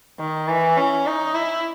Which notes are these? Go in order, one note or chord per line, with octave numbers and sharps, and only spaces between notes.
D#3
E3
C#4
D#4
E4